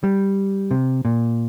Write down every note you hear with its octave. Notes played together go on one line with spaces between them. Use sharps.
G3
C3
A#2